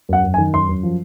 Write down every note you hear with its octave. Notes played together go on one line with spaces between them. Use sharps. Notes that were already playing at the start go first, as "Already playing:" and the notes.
F#2 F#5
F#2
G#5
D#3
F#2 C6
F#2
F3